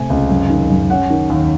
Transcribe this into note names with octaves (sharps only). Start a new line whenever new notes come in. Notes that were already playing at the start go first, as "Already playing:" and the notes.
Already playing: C3 A3 G#5
C#2
F#2
D#3
F#2
C#4 F#5
D#3
D#2